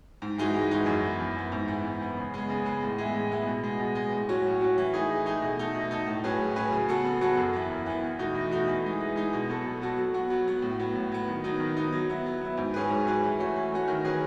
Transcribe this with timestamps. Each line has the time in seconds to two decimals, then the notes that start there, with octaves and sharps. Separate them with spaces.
0.22 G#2
0.38 E3 G#3 D#4 F#4
0.54 G#2
0.71 E3 G#3 D#4 F#4
0.86 F#2
1.03 E3 B3
1.20 F#2
1.35 E3 B3
1.52 G#2
1.68 E3 B3
1.85 G#2
2.01 E3 B3
2.16 C#3
2.34 G#3 B3
2.50 C#3
2.65 G#3 B3
2.83 A2
2.98 E3 G#3 B3 E4
3.15 A2
3.31 E3 G#3 B3 E4
3.47 B2
3.63 G#3 B3
3.79 B2
3.95 G#3 B3
4.13 A2
4.29 F#3 C#4 F#4
4.45 A2
4.61 F#3 C#4 F#4
4.78 E3
4.94 A3 D#4 G#4
5.09 E3
5.26 A3 D#4 G#4
5.42 B2
5.59 A3 D#4 A4
5.75 B2
5.91 A3 D#4 A4
6.07 A2
6.24 F#3 C#4 G#4 B4
6.40 A2
6.56 F#3 C#4 G#4 B4
6.72 C#3
6.89 F#3 B3 F#4 A4
7.05 C#3
7.21 F#3 B3 F#4 A4
7.37 F#2
7.53 E3 B3
7.70 F#2
7.86 E3 B3
8.03 E2
8.19 B2 A3 D#4 F#4
8.35 E2
8.51 B2 A3 D#4 F#4
8.68 E3
8.84 G#3 D#4
9.00 E3
9.16 G#3 D#4
9.33 B2
9.48 F#3 B3 F#4 A4
9.65 B2
9.81 F#3 B3 F#4 A4
9.98 F#3
10.14 B3 F#4
10.30 F#3
10.47 B3 F#4
10.62 A2
10.80 F#3 B3
10.95 A2
11.12 F#3 B3
11.28 D#3
11.44 F#3 B3 D#4
11.60 D#3
11.77 F#3 B3 D#4
11.92 F#3
12.10 B3 E4
12.26 F#3
12.41 B3 E4
12.57 G#2
12.74 F#3 C#4 G#4 B4
12.90 G#2
13.07 F#3 C#4 G#4 B4
13.24 E3
13.39 A3 C#4 F#4
13.56 E3
13.72 A3 C#4 F#4
13.88 D#3
14.05 F#3 C#4 G#4 B4